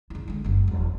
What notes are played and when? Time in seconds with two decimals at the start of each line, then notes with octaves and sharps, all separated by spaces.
0.10 C#3 E4
0.28 D3 G#3
0.44 G1 F#2
0.68 E1